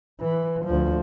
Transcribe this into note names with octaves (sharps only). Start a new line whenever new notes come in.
E3
D2 F3